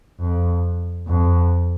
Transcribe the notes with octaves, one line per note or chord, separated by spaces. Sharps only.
F2
F2